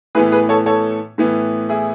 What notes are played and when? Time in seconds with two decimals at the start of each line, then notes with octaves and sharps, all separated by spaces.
0.15 A2 E3 B3 G#4 B4
0.32 G#4 B4
0.49 A4 C#5
0.66 A4 C#5
1.18 A2 E3 B3
1.69 E4 G#4